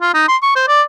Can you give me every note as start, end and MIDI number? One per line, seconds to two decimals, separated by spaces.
0.01 0.12 65
0.14 0.27 63
0.28 0.37 84
0.42 0.51 85
0.56 0.64 72
0.68 0.82 74